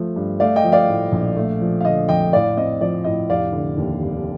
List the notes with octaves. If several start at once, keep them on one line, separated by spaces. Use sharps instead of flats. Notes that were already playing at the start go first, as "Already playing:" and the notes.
Already playing: F3 A3
G2
A3 D5 F5
D#5 G5
F3
D5 F5
A2
A#1
A3
F3
F5
D3 D#5
F2 D#5 G5
A2 D5 F5
C4 D#5
F3 D5
A2 D#5
F1 D5 F5
D3
D#2
F1